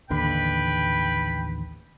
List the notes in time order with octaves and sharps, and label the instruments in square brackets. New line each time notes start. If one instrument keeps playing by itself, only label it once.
[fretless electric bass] A1 D#2 D3 [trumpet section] B4 G5 B5